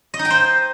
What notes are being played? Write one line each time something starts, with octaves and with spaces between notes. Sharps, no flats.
D#5
D#4
G5
C5